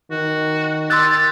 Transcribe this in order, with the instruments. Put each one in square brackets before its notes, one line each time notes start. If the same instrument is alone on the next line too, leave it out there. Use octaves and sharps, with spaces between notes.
[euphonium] D#3 [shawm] F#4
[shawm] G4 [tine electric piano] C6 E6 F#6 [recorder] A6